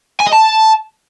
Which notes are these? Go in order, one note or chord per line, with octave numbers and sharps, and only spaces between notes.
G#5
D#5
A5